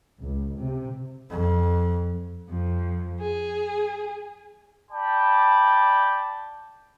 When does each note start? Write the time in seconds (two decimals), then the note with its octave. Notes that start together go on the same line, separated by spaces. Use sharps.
0.19 C#2
0.58 C3
1.30 F2
2.49 F2
3.20 G#4
4.91 D5 G5 A5 B5 D6